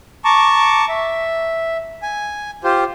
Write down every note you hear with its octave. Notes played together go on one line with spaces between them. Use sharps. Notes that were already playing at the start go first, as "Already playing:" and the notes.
A5 A#5 C#6 D6
E5
G#5
F4 G4 C5